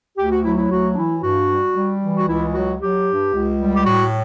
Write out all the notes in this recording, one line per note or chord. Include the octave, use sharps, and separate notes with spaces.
D2 G4
F#4
F#3 E4
E4
D2 F#4
D4
E3 E4
G2 F#4
G3
G3
E3
F#4
C#2 E4
F#3 F#4
F#3 G4
G2
C#2
G3
G4
A2 F#4